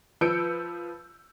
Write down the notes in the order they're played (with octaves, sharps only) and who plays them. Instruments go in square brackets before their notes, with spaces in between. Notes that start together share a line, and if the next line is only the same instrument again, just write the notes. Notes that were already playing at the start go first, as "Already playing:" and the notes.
[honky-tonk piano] F3 B4 E6 G6 C#7 D7